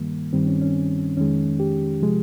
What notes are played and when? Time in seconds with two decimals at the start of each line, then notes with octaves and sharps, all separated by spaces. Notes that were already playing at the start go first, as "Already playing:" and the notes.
Already playing: G2 D#3 G3 A#3
0.33 G2 D#3 G3 C4
0.47 C#4
0.61 C#4
1.17 F2 D#3 G#3 C#4
1.60 G4
2.02 C3 F3 G#3